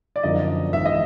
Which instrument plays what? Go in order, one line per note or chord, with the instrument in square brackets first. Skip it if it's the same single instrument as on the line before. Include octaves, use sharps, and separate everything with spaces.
[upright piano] D5
[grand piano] F#2 D3 F3 A#3 D#4 [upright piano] D#5
[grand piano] G#1 G#2 E3 [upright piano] E5
[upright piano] D#5